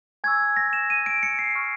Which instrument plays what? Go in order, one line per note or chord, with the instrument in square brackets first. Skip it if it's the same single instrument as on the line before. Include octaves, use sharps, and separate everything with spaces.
[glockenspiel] G#5 C#6 E6 G#6
A#6
E7
D#7
D7
C#7
C7
C#6 F6